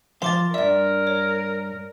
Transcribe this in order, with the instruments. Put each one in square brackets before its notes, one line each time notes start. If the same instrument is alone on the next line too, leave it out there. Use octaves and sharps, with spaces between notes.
[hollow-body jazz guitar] F3 C5 F5 [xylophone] C6 D6 A6
[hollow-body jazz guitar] G2 E5 [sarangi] A#4 [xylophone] D5
[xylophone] C#5